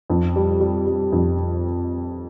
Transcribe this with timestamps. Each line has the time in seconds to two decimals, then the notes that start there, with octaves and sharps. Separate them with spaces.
0.10 F2
0.36 G3
0.61 G3
0.87 G3
1.12 F2